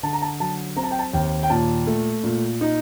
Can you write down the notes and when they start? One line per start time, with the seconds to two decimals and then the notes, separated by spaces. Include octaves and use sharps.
0.03 D3 A5
0.13 A#5
0.22 A5
0.40 F#3 A5
0.77 C4 A#5
0.84 A5
0.91 G5
0.99 A5
1.13 D#2 G5
1.43 G5
1.50 A#2 A5
1.87 A3
2.24 A#2
2.61 D#4